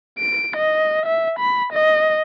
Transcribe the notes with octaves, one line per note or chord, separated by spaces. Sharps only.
D7
D#5
E5
B5
D#5